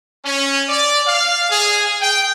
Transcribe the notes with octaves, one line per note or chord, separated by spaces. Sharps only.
C#4
D5
F5
G#4
G5